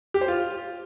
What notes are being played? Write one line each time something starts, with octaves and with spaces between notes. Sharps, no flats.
G4
C5
F4